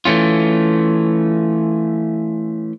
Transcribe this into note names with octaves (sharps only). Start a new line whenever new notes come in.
E3 A3 C#4 F4